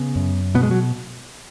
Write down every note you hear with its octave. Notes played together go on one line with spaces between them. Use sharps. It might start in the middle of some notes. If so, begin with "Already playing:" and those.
Already playing: C#3 B3
F#2
B2 B3
G#3
F#3